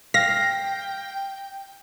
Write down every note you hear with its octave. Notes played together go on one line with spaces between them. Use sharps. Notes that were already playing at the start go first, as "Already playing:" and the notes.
F5 G5 A#6